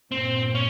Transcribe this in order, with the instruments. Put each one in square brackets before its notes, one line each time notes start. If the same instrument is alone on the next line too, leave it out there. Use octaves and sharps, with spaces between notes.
[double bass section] G2 A#2 [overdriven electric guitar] C4
[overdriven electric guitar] C#4